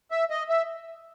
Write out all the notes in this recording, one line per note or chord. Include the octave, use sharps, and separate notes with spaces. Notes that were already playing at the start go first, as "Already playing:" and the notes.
E5
D#5
E5